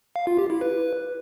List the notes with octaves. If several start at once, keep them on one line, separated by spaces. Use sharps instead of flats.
F5
F4
G4
E4
B4